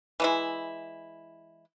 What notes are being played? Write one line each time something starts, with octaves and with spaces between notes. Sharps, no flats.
E3 G#3 E4